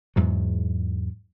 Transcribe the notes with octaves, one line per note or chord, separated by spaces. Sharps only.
E2 G#2 F#3